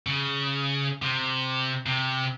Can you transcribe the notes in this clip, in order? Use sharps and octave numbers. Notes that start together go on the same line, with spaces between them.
C#3
C3
C3